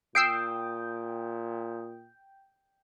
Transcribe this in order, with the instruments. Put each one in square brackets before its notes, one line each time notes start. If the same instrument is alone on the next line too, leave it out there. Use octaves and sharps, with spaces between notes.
[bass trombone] A#2 [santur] G5 [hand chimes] D#6 [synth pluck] E6 C7 D7